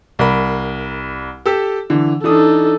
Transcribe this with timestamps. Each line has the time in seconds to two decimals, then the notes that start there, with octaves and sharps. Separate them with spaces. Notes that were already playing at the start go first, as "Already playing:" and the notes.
0.19 C2 A#4 B5
1.46 G4 A4 E6
1.90 D3 E3
2.24 E3 D4 D#4 A4 D#6